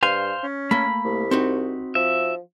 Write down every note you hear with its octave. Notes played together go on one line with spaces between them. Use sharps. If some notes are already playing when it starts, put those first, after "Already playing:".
G2 C5 F5 G#5
C#4
A3 A#3 B5
C2
C4 D#4 F#4
F3 E5